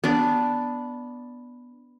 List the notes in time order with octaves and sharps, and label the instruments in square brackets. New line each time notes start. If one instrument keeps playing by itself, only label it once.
[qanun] B3 D4